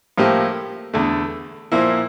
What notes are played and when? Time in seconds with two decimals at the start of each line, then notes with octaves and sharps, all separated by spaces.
0.18 A2 F3 A#3 E4 G4
0.94 E2 D3 A3
1.72 A#2 F3 A#3 E4